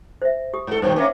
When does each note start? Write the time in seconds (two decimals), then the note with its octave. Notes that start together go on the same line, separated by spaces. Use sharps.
0.22 C5 E5
0.53 G4 D#6
0.67 G#2 A4
0.82 G2 B2 D#3 C5
0.96 A#3 C#4 E5 F#5 G#5